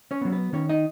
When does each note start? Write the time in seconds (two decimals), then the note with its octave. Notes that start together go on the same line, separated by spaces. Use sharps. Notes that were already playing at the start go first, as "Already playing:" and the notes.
0.11 C#4 C#5
0.21 B3
0.25 F#3
0.32 B3 B4
0.53 D#3 C#4 C#5
0.69 D#4 D#5